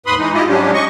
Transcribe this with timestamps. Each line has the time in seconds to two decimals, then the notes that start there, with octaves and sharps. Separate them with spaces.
0.06 D#2 G#2 B4 B5 C6 D#6
0.18 E3 G#3 D#4
0.34 E4 F4 G4 D#5
0.48 G#2 F#3 G3 C#4 D4 G4
0.73 D#5 C#6